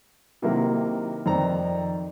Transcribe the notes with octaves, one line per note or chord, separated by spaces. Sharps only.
C3 D#3 F#3 A#3 E4 A#4
F2 D#3 C5 D5 A#5